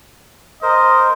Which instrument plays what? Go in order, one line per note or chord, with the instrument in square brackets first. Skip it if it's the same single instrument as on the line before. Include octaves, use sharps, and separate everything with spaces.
[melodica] A#4 C5 [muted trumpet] D#5